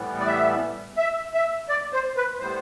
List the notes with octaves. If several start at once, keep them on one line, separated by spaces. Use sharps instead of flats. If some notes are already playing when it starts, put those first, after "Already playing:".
Already playing: A2 E3 G3 B3
D5
E5
E5
E5
D5
C5
B4
A2 G3 B3 C5